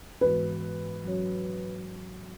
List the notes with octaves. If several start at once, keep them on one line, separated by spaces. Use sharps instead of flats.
G#2 E3 G#3 B3 F#4 B4
F#3 C#4 F#4 C#5